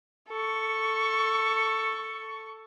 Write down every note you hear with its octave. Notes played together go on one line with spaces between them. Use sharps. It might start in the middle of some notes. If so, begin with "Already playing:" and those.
A4 C#6